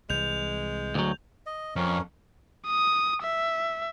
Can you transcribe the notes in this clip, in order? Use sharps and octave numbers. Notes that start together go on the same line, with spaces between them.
C2 E3 G#3 G6 F7
D2 F#3
D#5
F2 C#4 A#4
D#6
E5